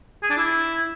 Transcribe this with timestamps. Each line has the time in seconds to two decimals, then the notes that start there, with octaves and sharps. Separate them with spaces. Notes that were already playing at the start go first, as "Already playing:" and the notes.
0.23 G#4
0.30 D4
0.38 E4